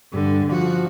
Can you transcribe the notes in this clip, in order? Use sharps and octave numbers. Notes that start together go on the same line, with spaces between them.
G2 D3
F3 F#4